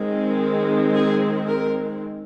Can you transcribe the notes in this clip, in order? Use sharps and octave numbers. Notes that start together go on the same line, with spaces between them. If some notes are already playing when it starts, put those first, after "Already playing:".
Already playing: D#3 G#3 C4
G#4
A#4